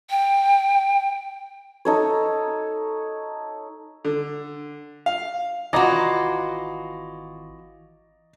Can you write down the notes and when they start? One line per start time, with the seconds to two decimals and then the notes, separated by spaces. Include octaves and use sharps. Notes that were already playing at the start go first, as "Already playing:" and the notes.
0.10 G5
1.85 D#4 A4 C#5
4.05 D3
5.06 F5
5.73 G#1 E3 F4 F#4 D5 D#5 A#5